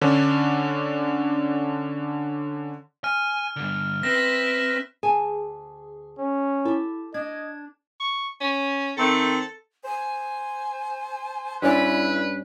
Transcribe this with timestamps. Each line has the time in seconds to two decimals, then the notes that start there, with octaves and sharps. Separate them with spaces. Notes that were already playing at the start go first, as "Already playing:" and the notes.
0.01 D3 C#4 D4
3.04 G#5 F6
3.56 G2 D3
4.03 C4 B4 E5 A#6
5.03 D2 G#4 G#5 A5
6.18 C#4
6.65 E4 G4 A4
7.14 D4 D#5 G#6
8.00 C#6
8.41 C#4
8.98 D#3 A3 C4 A4
9.84 C5 G#5
11.62 G2 C#4 E4 B4 D5